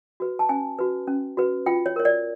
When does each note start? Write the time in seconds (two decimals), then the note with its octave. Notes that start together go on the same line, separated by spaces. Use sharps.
0.20 F#4 B4
0.39 A5
0.49 C#4 G#5
0.79 F#4 B4
1.07 C#4
1.37 F#4 B4
1.66 F4 G5
1.86 C#5
1.96 A#4 C#5
2.05 D5